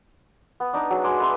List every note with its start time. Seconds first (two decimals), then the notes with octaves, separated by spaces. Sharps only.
0.60 B3
0.73 D4 D#4 D5
0.90 F#3 G#4
1.04 G#3 G#5 D6
1.20 B4 E5 B5 C6